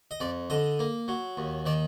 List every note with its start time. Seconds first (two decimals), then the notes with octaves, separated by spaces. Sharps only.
0.11 D#5
0.20 F2 D5
0.50 D3 D#5
0.79 A#3
1.08 F#3
1.37 D#2
1.66 D#3 D5